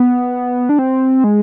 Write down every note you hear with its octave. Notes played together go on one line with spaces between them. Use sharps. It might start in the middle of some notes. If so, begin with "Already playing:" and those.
Already playing: B3
D4
C4
G#3